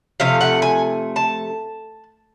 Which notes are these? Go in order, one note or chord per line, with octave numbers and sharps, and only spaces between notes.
C3 F3 A3 F5
F#5
G#5
A5